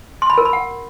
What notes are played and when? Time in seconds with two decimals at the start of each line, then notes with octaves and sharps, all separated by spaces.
0.22 C6
0.30 B5
0.38 A#4
0.45 B5
0.53 F#5